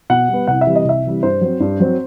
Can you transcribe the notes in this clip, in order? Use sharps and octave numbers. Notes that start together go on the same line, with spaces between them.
B2 F#5
G3
B3
C2 F#5
E5
C3 E3 G3
D#5
C2 E5
C3 E3 G3
G2 C5
F#3 C4
G2
F#3 C4